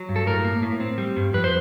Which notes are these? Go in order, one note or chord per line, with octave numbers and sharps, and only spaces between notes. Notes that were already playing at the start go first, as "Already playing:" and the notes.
Already playing: F#3
G2
A4
A2 A#4
A#3
A2
C4
G3
G2
F2 B4
C5